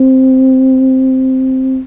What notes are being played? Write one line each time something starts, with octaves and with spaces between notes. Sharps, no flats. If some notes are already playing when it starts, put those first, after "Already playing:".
Already playing: C4